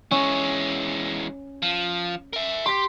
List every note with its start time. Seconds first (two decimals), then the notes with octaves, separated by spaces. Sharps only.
0.11 E3 G#3 C#4
1.62 F3
2.33 A#4 E5
2.66 G4 C6 B6